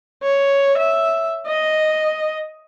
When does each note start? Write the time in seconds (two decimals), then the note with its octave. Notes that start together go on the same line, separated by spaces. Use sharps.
0.23 C#5
0.77 E5
1.47 D#5